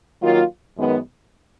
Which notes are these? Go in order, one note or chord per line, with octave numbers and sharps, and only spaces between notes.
D#3 F#3 A#3 F4
F#2 D#3 G#3 B3